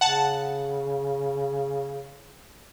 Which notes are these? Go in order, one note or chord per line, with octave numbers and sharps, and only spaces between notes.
C#3 F#5 A5